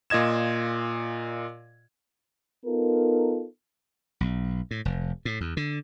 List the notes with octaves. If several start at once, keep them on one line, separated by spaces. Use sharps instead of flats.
A#2 F4 D#5 G#6 E7
B3 D#4 F4 A4 A#4
B1
A2
F1
A2
E2
D3